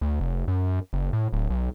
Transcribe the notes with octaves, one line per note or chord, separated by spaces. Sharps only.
D2
F1
F#2
F#1
A2
D1
B1